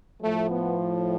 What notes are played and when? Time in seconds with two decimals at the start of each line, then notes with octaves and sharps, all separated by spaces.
0.22 A2 F3 A3
0.50 B3